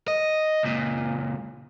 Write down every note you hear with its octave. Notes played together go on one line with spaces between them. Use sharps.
D#5
C#2 A#2